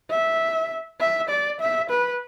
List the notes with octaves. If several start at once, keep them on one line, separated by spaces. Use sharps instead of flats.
E5
E5
D5
E5
B4